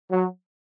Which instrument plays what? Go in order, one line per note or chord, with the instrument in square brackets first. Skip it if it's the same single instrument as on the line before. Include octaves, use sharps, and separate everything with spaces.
[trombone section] F#3